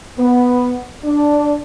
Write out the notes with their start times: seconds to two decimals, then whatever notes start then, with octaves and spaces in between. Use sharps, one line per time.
0.18 B3
1.04 D4